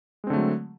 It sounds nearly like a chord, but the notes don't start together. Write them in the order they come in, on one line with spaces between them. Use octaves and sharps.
G#3 C4 D3 A3 F#3